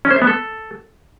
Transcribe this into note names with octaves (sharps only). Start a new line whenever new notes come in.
C#4
C5
E5
B3
A4